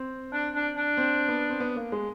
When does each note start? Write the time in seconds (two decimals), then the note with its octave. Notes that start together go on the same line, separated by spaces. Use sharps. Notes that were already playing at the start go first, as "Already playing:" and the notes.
Already playing: C4
0.33 D4
0.55 D4
0.77 D4
0.97 C4
1.29 B3
1.50 C4
1.60 B3
1.76 A#3
1.92 G#3